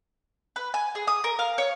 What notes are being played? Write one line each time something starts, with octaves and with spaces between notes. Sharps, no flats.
B4
G#5
G#4
D#6
A#4
F5
C#5